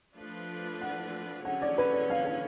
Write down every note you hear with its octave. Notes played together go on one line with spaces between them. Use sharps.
F3 A3 D4 F4 B4
F#5
D3 F#3 C#4 G#4 C#5 F#5
D5
B4
D5
F5
F5